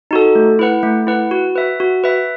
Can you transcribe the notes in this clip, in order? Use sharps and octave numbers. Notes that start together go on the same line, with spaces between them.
D#4 F#4 A4
A3
E4 B4 F#5
A3
E4 B4 F#5
F#4
B4 E5
F#4
B4 E5